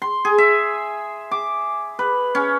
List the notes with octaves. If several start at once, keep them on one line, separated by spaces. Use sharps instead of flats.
C6
G#4
E5
D6
B4
C#4